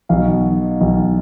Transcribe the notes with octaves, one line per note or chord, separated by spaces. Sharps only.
B1 B2 F5
B1 B2